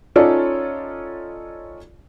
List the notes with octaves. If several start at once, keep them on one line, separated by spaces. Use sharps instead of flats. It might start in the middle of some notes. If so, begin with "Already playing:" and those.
C#4 D#4 F4 A4 C#5 D5